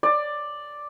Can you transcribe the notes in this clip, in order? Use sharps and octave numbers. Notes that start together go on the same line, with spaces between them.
D5